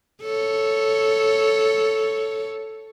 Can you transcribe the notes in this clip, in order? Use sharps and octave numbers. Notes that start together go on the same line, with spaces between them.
A4 C#5